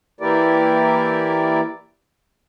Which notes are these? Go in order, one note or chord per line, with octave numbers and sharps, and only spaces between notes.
E3 A#3 E4 G4 A#4 D5